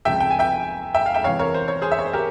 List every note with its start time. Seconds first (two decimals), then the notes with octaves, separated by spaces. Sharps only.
0.05 C#2 C3 F3 E5 G5
0.20 G5
0.31 G#5
0.39 E5 G5
0.94 E5 G5
1.06 F5
1.14 E5 G5
1.24 E2 C3 E3 C#5 F5
1.39 A#4 C#5
1.54 C5
1.68 C#5
1.82 G#4 C5
1.92 E5
1.99 C#5
2.06 C5
2.13 G4 A#4